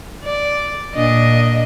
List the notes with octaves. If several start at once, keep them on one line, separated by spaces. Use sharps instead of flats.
D5
A#2 D4 D#5